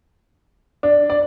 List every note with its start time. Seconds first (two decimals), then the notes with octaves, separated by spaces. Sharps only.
0.83 D4
1.10 D5